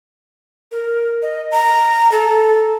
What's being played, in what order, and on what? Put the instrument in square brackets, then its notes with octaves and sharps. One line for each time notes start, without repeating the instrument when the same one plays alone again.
[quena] A#4
D#5
A#5
A4